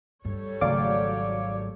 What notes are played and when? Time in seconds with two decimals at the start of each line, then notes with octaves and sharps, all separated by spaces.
0.25 G2 G3 A4 C#5
0.61 G#1 C#3 F#3 A3 D5 F5 D6